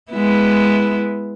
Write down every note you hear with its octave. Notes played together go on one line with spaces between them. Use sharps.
G#3 B3 E4